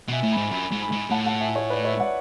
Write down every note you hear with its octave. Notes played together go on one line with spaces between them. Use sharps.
B2 E5 G#5
A2
G#5 B5
G#2
F#2 G#5 B5
G#2
G#5 B5
G#2
A2 F#5 A5
F#5 A5
E5 G#5
C#5
B4 D5
C#5 E5
D5 F#5